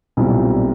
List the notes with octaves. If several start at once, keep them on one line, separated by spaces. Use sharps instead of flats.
B1 A#2 G3 C4 E4